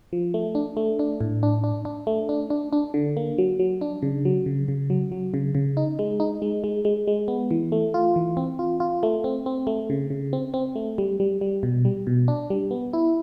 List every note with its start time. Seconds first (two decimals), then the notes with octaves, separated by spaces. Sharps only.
0.13 F3
0.34 A3
0.55 D4
0.77 A3
0.99 D4
1.21 A2
1.43 D4
1.64 D4
1.85 D4
2.07 A3
2.29 D4
2.50 D4
2.73 D4
2.94 D3
3.17 A#3
3.38 F#3
3.59 F#3
3.81 D4
4.02 C#3
4.25 F#3
4.46 C#3
4.68 C#3
4.90 F#3
5.12 F#3
5.34 C#3
5.55 C#3
5.77 D#4
5.99 G#3
6.20 D#4
6.42 G#3
6.64 G#3
6.85 G#3
7.07 G#3
7.28 B3
7.51 E3
7.72 A3
7.94 F4
8.16 E3
8.37 C4
8.59 F4
8.80 F4
9.03 A3
9.24 C4
9.46 C4
9.67 A3
9.90 C#3
10.10 C#3
10.33 C4
10.54 C4
10.76 A3
10.98 G3
11.20 G3
11.41 G3
11.63 B2
11.85 G3
12.07 B2
12.28 D4
12.50 G3
12.71 B3
12.93 E4